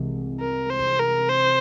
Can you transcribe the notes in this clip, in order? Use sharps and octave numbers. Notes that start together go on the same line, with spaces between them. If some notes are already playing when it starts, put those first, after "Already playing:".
Already playing: C2 C3 E3 G#3
A#4
C5
A#4
C5